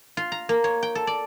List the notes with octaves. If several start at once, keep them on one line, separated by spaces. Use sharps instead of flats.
F4
A#5
A#3
C#5
G5
A4
D5